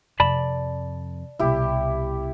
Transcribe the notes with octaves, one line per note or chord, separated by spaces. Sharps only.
F2 C3 D5 A5 B5
C2 B2 E4 G4